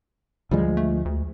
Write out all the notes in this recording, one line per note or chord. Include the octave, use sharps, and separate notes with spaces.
D2 F3 G3 G#3
A3
D2